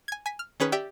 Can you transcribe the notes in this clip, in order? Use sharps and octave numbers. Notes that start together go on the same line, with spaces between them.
G#5 G#6
G#5 B6
F6
D#3 C#4 G#4 B4
G4 D5 E5 G5